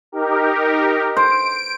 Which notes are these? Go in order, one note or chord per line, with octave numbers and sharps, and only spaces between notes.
D#4 G4 A#4
C5 D7